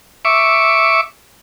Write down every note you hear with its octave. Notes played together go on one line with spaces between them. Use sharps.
E5 C#6 D6